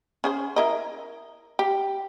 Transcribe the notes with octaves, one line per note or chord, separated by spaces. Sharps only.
C#4 G#4 C5
E4 A#4 D#5
G4